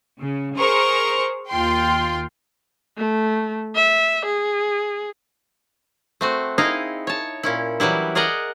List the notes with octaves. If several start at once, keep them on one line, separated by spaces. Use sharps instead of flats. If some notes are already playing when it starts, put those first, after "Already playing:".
C#3
G#4 A#4 C5 A#5 C#6
D#2 F4 G5 C6
A3
E5
G#4
A3 C4 F#4
D#4 E4 G#4 D#5 F5
C#5 A5
A#2 C#4 E4
E3 F#3 G3 E4
G#4 A#4 D5 D#5 F#5